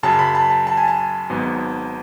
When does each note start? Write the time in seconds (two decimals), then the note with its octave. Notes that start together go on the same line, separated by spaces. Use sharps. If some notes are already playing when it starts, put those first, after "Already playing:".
0.03 F#2 C#3 F#3 A5
0.19 B5
0.35 A5
0.50 A5
0.67 A5
0.77 G#5
0.88 A5
1.30 G#1 G#2 F#3 B3